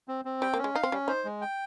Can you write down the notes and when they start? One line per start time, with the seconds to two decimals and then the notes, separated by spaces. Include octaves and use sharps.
0.08 C4
0.25 C4
0.42 G3 G5
0.54 A#3
0.59 C#4
0.64 G#3
0.74 D#4 F5
0.83 C4
0.92 G3 C#4
1.08 D#4 C5
1.25 G#3
1.41 G5